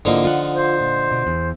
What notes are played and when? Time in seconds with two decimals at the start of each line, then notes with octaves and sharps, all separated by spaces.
0.05 G#2 D3 F3 A#3 D#4 E4
0.25 F4 F#5
0.54 C5
0.81 A#2
1.12 B2
1.27 E2